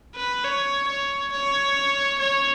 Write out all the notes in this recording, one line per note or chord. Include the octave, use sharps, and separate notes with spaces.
B4
C#5
C#5
C#5
C#5